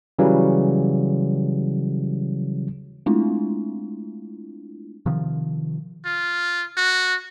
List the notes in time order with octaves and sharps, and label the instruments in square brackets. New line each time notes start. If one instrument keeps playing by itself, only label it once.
[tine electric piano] C#3 E3 F#3 G3
[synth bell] G#3 A3 C4 D4 E4 F4
[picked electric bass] C3 D#3 F3
[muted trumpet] F4
F#4